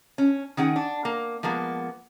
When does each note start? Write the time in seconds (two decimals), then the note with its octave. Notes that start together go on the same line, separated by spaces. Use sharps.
0.18 C#4
0.57 D#3 C#4 G#4 F#5
0.76 D4
1.05 A#3
1.43 F3 G#3 A#3 B3